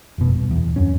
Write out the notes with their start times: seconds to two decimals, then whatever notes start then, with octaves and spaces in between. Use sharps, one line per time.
0.18 F1 B2
0.34 D#1
0.51 E2
0.76 F#2 C#4